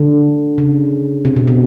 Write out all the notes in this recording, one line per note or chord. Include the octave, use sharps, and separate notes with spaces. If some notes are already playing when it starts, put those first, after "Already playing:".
Already playing: D3
C#3
C3
B2
B2